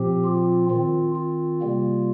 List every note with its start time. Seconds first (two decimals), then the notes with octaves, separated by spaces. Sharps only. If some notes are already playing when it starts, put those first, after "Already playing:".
Already playing: A#2 F3 C4 G4
0.24 F4
0.69 D#3 C4 F4
1.15 F4
1.61 C3 G3 A#3